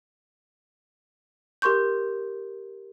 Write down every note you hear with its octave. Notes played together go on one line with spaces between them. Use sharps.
G4 A#4 C6 C#6 G6